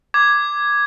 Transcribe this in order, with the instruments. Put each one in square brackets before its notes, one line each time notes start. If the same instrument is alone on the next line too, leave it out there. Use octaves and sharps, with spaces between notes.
[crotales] D6 G#6